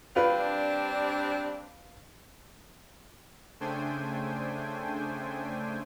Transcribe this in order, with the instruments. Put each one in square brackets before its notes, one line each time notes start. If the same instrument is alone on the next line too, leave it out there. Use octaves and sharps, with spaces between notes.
[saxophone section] G3 C4 D4 [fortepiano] F4 B4
[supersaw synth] C#3 A3 D4 C5 G5 G#5